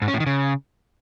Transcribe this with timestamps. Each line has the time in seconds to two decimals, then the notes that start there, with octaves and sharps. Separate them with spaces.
0.02 G#2
0.08 C#4
0.14 A2
0.20 D#3
0.26 C#3